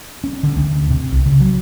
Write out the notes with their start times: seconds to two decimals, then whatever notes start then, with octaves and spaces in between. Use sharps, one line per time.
0.24 C#4
0.43 D3
0.56 D2
0.90 C3
1.11 C2
1.26 C#3
1.40 F#3